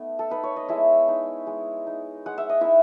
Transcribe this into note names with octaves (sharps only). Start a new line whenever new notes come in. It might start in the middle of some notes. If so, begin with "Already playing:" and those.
Already playing: A3 B3 D#4
A4
D#4 B4
C#5
D#5
G#3 E4 E5
D#4
G#3
D#4
G#3 F#5
E5
D#5
D#4 E4 E5